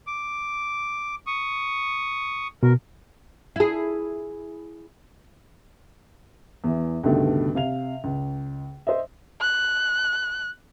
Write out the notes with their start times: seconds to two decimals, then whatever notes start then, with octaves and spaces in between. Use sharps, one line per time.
0.07 D6
1.27 C#6 D#6
2.63 B2 A#4
3.56 E4 G#4
6.64 E2 E3
7.04 C#2 G2 B2 D3 D#3 A3
7.55 C3 F5 F7
8.04 C#2
8.87 C5 D#5 E5
9.40 F#6